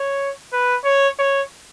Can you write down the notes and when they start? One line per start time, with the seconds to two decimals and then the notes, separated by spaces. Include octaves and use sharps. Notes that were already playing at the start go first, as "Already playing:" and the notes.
Already playing: C#5
0.52 B4
0.85 C#5
1.19 C#5